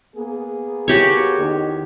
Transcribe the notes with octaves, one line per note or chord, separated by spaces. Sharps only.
A#3 B3 G#4
F#4 G4 C#5
E2 D#3